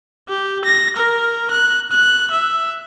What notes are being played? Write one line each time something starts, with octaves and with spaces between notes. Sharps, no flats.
G4
A#6
A#4
F#6
F#6
E5